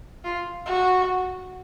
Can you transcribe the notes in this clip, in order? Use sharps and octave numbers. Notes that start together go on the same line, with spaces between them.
F4
F#4